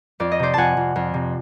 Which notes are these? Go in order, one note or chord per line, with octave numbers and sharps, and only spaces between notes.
F2 D5
D#5
C3 C5 D5
F2 F#5 G#5 A5
F2
F2
C3